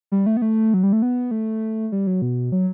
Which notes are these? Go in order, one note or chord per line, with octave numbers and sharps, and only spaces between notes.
G3
A3
B3
A3
F#3
G3
A3
B3
A3
G3
F#3
B2
F#3